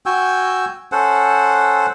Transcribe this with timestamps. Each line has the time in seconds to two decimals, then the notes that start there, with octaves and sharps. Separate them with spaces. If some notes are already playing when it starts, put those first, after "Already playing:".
0.06 F#4 G5 G#5 E6
0.92 C#4 A4 C5 F#5